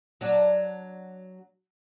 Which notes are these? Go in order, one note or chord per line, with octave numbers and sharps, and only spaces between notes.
F#3 D4